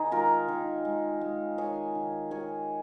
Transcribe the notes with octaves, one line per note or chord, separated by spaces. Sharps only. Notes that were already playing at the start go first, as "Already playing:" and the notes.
Already playing: D#3 D#4 G#4
G#3 F4 A#4
D#3
G#3
G#3
D#3 G#4 C#5
D#3
D#3 G#4 C#5